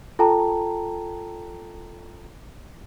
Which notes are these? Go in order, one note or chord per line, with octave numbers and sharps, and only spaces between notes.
F4 A4 G5 A5 A#5